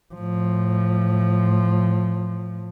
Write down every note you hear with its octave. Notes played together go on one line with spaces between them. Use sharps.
A2 F3